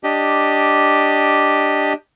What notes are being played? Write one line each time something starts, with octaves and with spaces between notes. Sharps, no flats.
D4 G4 D#5